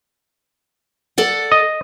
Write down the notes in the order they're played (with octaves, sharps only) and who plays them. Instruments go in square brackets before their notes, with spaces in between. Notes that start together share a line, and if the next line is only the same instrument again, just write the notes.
[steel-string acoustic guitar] A4 D5 F#5
[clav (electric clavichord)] D#5